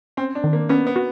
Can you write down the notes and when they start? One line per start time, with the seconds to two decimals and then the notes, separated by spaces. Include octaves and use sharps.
0.17 C4 C#4
0.35 D4
0.44 D#3
0.53 A#3
0.69 B3 C#4
0.87 B3
0.96 F#4